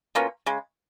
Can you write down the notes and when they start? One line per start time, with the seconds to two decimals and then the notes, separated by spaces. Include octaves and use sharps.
0.15 B2 A#3 C#4 F4
0.46 C#3 G#3